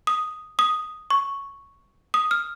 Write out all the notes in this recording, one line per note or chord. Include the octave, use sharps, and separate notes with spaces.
D#6
D#6
C#6
D#6
F6